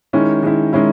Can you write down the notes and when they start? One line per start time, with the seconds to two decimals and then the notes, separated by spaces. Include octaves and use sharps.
0.13 D#3 G#3 C#4 E4
0.43 D#3 G#3 C#4 E4
0.73 D#3 G#3 C#4 E4